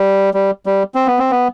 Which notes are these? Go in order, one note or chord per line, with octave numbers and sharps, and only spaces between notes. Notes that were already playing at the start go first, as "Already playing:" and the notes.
Already playing: G3
G3
G3
C4
B3
C4
B3